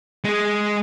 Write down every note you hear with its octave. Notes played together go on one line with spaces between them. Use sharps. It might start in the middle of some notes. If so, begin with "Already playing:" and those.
G#3 G#4